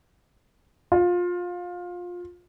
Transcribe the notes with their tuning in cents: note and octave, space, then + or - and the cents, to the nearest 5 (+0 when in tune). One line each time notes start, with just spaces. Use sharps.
F4 +20